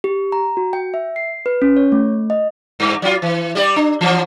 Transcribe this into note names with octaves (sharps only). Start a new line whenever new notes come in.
G4
A#5
F#4
G5
E5
C7
B4
C#4
C#5
A3
D#5
G2
F#3 F4
E3
G3 G4 D5
D4
E3 F3